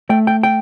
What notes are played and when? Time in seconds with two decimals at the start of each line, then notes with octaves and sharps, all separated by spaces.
0.10 A3 G5
0.27 G5
0.43 G5